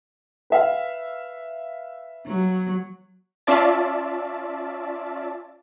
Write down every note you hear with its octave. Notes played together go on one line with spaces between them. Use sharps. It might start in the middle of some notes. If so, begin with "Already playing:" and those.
B4 E5 F5
F#3
C#4 F4 D5 E5 A5